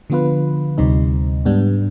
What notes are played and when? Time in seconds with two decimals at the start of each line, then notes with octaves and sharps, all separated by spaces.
0.10 D3 F3 B3 F4 B4
0.78 D2 C3 G3 C4 D#4
1.45 G#2 G3 B3 D4